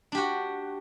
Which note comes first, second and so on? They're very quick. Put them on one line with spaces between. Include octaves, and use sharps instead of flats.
D4 G4 F#4